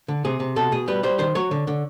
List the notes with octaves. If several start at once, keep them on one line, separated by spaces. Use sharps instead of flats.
D3
C3 G#4
C3
B2 A4
B2 G#4
G3 B4
G3 C5
D#3 C5
F#3 C#5
D3
D3